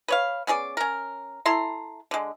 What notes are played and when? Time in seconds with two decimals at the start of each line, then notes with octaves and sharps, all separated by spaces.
0.08 B4 C#5 F5
0.47 B3 C#4 G#4 D5
0.77 C#4 A#4
1.46 E4 A4 A#5 C6
2.11 D3 G#3